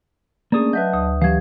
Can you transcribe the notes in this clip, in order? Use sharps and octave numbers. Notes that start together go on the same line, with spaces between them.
A3 A#3 C#4 D4 G#4 D5 D#6
F#3 B4 D#5 E5 F#5 A5 G6
D2 D#6
E3 F#3 G4 F5 G#6